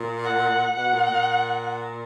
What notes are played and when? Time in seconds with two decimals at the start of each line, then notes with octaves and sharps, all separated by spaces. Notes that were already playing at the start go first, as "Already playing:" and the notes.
Already playing: A#2
0.25 F#5
0.76 B2 F#5
0.93 A#2
1.10 A#2